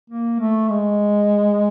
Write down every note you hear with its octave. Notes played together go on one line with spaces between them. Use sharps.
A#3
A3
G#3